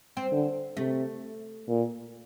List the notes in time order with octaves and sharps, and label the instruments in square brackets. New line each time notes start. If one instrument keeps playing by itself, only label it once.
[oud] C4
[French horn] D3
[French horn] C3 [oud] A3
[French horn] A#2